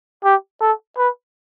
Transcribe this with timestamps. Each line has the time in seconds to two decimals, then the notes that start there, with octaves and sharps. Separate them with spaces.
0.24 G4
0.61 A4
0.98 B4